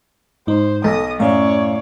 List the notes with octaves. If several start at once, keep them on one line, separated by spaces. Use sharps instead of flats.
G#2 D#4 C5
B1 A4 D#6 A#6
F#2 A2 C#4 C#5 D5 F5